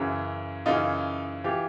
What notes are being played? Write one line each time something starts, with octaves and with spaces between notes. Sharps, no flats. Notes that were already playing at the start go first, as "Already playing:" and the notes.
Already playing: F#2 C#3 E3
F#2 C#3 E3 D#4 F4
E3 F4 G4